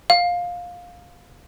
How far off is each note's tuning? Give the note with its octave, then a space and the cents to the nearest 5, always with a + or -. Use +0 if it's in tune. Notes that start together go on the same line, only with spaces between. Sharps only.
F5 +15